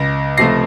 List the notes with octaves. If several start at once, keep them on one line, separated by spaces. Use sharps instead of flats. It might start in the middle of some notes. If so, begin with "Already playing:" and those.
Already playing: C#2 A#6
C3 F3 A3 A#6 C7